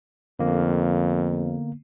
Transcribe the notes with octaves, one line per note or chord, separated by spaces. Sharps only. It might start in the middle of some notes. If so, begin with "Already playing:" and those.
F2 D3 A#3 B3